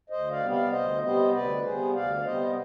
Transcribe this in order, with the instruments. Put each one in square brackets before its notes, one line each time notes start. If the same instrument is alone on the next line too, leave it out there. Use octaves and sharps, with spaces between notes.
[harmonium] D2 C5 D#5
D5 F5
C3 G3 B3
D5 F5
D2 C5 D#5
C3 G3 B3 C5 D#5
D2 B4 D5
C3 G3 B3 G#4 C5
D2 D5 F5
D5
C3 G3 B3 C5 D#5